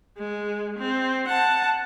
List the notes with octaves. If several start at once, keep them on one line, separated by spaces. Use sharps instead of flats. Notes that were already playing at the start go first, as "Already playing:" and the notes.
G#3
C4
F#5 A5